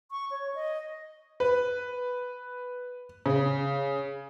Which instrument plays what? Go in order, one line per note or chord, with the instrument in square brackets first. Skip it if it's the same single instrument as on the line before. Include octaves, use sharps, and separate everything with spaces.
[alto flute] C#6
C#5
D#5
[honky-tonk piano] B4
C#3